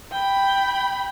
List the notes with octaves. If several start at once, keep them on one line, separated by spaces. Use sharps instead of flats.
G5 B5